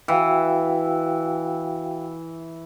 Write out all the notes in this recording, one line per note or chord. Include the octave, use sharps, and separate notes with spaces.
E3 F#4 F5 G5